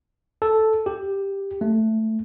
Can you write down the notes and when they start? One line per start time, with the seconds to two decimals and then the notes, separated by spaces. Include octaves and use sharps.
0.42 A4
0.86 G4
1.61 A3